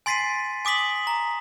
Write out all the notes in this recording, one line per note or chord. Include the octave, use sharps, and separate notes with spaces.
G#5 C6 A6 B6 C7 D#7
G#5 D6 D#6 B6 F#7
A#5